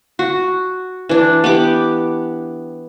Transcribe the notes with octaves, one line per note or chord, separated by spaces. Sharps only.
F#4
E3 D4
B3 G4 D6